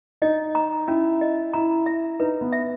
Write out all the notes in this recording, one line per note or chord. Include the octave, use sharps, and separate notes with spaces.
D#4 D#5
A#5
C#4 E4
D#5
E4 A#5
E5
D#4 B4
B3
E5